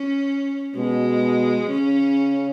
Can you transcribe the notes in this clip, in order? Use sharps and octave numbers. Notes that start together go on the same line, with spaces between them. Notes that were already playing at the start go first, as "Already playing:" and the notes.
Already playing: C#4
B2 G#3
C#3 C#4